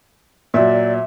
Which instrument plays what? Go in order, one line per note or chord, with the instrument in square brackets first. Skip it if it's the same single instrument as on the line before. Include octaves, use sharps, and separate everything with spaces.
[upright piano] A#2 F#3 [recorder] D5 [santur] E5